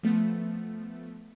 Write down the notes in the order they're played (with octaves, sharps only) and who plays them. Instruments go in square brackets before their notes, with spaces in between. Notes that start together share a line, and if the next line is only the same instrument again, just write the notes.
[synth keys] F3 A3 B3